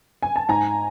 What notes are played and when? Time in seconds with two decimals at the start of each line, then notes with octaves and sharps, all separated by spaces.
0.22 G#5
0.36 A5
0.49 G#2 G#5 A#5